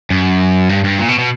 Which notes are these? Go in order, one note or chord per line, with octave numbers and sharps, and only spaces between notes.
F#2
G2
G2
A#2
B2
B2